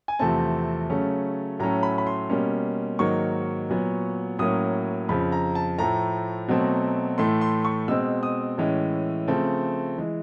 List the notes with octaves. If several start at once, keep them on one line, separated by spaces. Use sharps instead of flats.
G#5
E2 C3 F3 A3 C4 A5
C#3 F#3 A3 C#4
A2 F#3 A3 C#4 A#5
B5
B5
C6
B2 G3 A#3 C#4
G#2 D#3 F#3 A#3 C#6
A#2 F#3 B3
A2 F#3 A#3 C#4 D#6
F2 C#3 F3 B5
A#5
A5
A2 F3 A3 A#5
B2 F#3 A3 C4
A2 E3 A3 C6
C6
C#6
B2 G#3 C4 E6
D#6
A2 E3 G#3 C#4
C#3 F3 A3 C4
E3 G#3